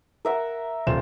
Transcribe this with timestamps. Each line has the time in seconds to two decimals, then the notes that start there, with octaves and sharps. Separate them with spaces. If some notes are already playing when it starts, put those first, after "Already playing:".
0.25 A#4 E5 F#5
0.87 D#1 F4 C5 E7